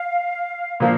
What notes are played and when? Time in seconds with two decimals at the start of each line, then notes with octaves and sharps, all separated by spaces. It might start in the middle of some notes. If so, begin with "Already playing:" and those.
Already playing: F5
0.80 A#2 F3 A#3 F5